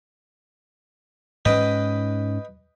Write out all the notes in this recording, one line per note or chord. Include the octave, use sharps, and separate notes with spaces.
G#2 C#4 B4 D#5 G5